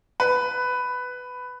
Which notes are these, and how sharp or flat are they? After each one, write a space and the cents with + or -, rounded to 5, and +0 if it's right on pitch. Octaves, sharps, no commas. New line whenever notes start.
B4 +10